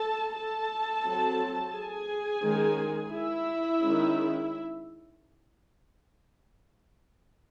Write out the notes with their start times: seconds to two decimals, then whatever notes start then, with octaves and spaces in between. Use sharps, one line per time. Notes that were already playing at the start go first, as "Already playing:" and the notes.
Already playing: A4 A5
0.35 A4 A5
1.04 F#3 C4
1.73 G#4 G#5
2.43 D#3 G#3 C#4
3.12 E4 E5
3.81 D#3 G#3 C#4